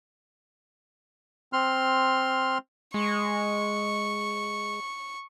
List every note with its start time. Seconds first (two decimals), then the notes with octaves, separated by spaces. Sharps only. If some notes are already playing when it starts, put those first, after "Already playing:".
1.53 C4 C6 F6
2.94 G#3 C#6